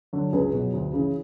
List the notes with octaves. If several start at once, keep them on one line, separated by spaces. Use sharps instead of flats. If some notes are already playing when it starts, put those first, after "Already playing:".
D3 F#3
C#2 G#4 B4
B2 F#3
D2
C#3 E3